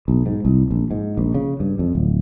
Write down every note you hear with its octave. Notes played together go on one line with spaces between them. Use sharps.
B1
G#2
C2
A#1
G#2
A#1
C#3
G2
F2
D1